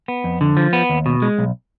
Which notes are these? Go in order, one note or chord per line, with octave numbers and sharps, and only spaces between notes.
B3
F2
D3
F3
B3
D#2
B2
G#3
B1